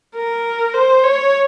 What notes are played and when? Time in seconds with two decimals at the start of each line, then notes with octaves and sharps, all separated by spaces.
0.16 A#4
0.74 C5
1.03 C#5